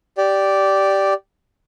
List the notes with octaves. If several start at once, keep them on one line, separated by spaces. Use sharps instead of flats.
G4 D5